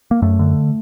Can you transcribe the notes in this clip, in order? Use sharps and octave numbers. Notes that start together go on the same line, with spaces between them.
A#3
F#2 A3
D3